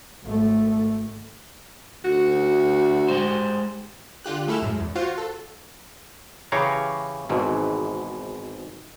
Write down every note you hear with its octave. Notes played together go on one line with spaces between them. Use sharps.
G#1 A3
D2 F#4
G#3 G4 C5
D3 F4 G4 F#6
G#3 A3 E4 A4 F6 E7
F#2 A2 G#3
E2
F4 F#4 C5 F5
A4
C#3 E3 G4 C#5 F5 A#5
G#1 G#2 B2 E3